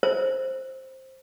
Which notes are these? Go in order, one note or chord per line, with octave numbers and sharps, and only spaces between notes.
C5